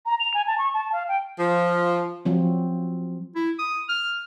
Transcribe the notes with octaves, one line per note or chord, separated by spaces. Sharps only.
A#5
F7
G#5
A5
C#6
A5
F5
G5
F3
F3 F#3 C4
E4
D#6
F6